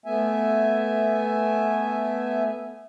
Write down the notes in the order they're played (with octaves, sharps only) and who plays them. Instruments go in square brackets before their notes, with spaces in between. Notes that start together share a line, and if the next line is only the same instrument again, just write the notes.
[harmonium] A3 B3 E5 G#5